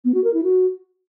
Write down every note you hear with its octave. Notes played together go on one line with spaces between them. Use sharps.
B3
F#4
A#4
E4
F#4